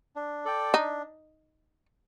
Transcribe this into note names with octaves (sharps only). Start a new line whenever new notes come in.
D4
A4 D5 G5
D4 D#4